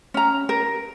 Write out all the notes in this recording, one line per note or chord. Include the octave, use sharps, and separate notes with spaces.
C#4 A#5
A#4